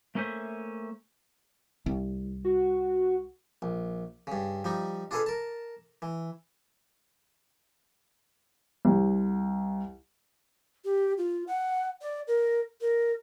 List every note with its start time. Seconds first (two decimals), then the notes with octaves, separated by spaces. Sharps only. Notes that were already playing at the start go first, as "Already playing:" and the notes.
0.15 A3 A#3 C#4 A4 C5 E5
1.86 C2
2.45 F#4
3.62 A#1
4.27 G2 C#3
4.64 F3 G3 D#4
5.11 D4 F4 G#4 A4 B4 F5
5.26 A#4 A5
6.02 E3
8.85 C2
10.85 G4
11.18 F4
11.47 F#5
12.01 D5
12.27 A#4
12.81 A#4